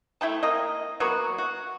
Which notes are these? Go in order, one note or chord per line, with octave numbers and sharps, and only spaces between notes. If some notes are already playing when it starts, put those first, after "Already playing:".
A3 E4 G5 A5
A#3 C4 D#5
F#3 A#3 B3 F#4
F#4